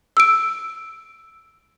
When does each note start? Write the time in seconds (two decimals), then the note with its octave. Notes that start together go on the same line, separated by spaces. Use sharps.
0.17 E6 D7